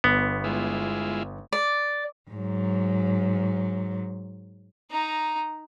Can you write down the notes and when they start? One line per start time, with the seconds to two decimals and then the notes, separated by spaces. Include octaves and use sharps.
0.04 G1 B3
0.44 G#3 E4 F4
1.53 D5
2.31 G#2 F#3
4.91 D#4 A#5